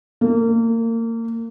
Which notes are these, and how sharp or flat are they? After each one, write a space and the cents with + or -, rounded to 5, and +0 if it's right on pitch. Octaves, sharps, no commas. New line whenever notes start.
A#3 -30